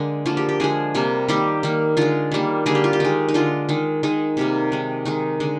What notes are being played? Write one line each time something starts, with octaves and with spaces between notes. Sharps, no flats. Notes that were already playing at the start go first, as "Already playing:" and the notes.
Already playing: D3 G#3 A#3
D3 F3 A#3 F4
G4
G4
D3 F3 G#3 G#4
C3 G3 A#3
D#3 G3 A#3 G4
D#3 A#3
D3 G#3 F4
D#3 G3 A#3
D3 G3 A#3 G#4
G4
F4
G4
D#3 G#3
D#4
D3 G#3 F4
D#3 G#3
D#3 G#3 D#4
C3 G3 A#3
D#3 G#3
D#3 G#3 D#4
D3 G#3